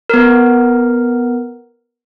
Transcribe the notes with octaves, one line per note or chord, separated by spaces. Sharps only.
B3 A#4